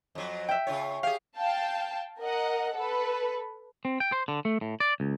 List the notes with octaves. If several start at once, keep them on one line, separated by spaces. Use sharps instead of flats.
F2 F#3
E5 G5
C#3 F4 C#5
G4 G#4 F5
F5 G5 A5
A#4 D#5 F#5
A4 B4
C4
G5
C5
D3
A3
A2
D5
C#2